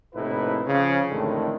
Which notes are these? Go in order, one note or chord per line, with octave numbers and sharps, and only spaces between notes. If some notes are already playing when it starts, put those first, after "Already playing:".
A#1 A2 C3 D#4 E4 B4
C#3 F3
A1 F2 A2 D3 D#3 G#3